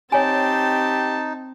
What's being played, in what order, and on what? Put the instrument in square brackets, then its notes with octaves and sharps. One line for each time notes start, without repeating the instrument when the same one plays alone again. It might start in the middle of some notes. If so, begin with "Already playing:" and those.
[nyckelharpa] C4 A5 [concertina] D#4 [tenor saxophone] G4 [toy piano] C#5 G#5